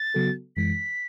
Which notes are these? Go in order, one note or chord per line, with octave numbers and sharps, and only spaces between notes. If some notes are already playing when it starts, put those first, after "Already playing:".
Already playing: A6
C#3 F#3 B3 F#4 A4
F#2 E3 G#3 B6